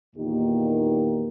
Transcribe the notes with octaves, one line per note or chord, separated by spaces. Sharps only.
E2 A#2 D#3 A#3 D#4 G4